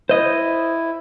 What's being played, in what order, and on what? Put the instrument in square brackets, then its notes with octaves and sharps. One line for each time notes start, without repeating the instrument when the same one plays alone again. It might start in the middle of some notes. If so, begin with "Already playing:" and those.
[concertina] E4 [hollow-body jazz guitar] C5 D#5